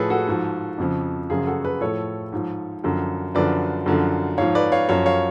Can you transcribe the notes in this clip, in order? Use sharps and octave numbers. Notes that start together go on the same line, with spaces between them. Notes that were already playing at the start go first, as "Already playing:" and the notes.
Already playing: A2 F3 G#4 A4 B4 C#5
F#4 A4
G#2 F3
F2 C#3 F3
F#2 C#3 F3 F4 G#4
F#4 A4
G#4 B4
A2 F3 A4 C#5
G#2 F3
F#2 D3 F3
F#2 D3 F3 B4 D5
F#2 D3 F3
G#2 F3 C#5 F5
B4 D5
C#5 F5
F#2 F3 C#5 F5
C#5 F5